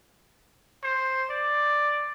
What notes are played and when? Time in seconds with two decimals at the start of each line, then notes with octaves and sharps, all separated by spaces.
0.84 C5
1.30 D5